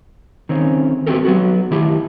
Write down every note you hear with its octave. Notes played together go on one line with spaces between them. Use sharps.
D#3 C4 C#4
B3 C4 F#4 G4 A4 A#4
F#3 B3 F#4
D#3 E4 G4